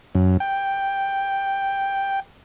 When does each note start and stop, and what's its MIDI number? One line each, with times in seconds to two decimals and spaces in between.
0.15 0.37 42
0.40 2.20 79